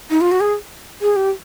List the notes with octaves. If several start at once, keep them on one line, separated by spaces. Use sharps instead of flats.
D#4
F4
F#4
G#4
G#4
G4